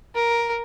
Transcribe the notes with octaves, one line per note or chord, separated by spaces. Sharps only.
A#4